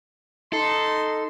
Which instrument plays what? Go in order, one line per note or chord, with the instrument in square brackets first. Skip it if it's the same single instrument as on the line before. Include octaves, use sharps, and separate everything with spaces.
[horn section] D#4 C6 [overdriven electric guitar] A4